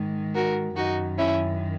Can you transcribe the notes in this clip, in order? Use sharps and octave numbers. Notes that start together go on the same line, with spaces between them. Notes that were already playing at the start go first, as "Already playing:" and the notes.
Already playing: G#2 D#3
F#4 A#4
F#2 D#3 D#4 F#4
C#4 E4